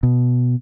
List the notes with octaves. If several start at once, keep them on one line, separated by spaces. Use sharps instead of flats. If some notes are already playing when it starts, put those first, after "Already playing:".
B2